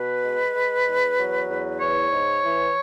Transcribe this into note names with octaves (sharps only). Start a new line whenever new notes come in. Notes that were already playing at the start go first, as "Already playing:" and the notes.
Already playing: B2 B4
G#3
G#3
E2
F#3
E2
E3 C#5
G#2
E3